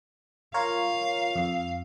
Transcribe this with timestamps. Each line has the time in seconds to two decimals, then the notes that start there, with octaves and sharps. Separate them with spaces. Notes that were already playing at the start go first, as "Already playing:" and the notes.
0.54 F4 A#4 C#5 F5
1.36 F2